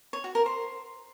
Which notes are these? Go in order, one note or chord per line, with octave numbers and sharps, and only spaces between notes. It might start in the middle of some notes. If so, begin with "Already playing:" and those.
C#5
F#4
A#4
C5